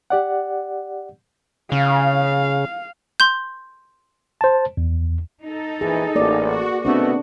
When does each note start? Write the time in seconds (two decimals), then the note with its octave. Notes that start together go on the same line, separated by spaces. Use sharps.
0.10 G4 D5 F#5
1.72 C#3 F5
3.20 C6 G6
4.41 C5 A5
4.77 E2
5.43 D#4 A4
5.81 A#1 E3 G#4
6.15 A1 A#3 D5
6.51 F#4
6.85 B2 A3 B3 C4 D4 F#4